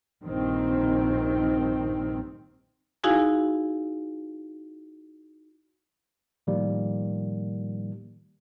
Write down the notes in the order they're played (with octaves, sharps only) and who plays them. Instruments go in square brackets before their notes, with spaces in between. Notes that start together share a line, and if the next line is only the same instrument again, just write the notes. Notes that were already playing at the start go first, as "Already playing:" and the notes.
[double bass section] A#1 G2 D#3 C4
[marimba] D#4 E4 F#4 G#4 F5 G#5
[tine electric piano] A2 D#3 F3 G3 A#3